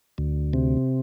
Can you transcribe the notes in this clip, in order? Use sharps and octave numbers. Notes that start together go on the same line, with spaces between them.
D2
C3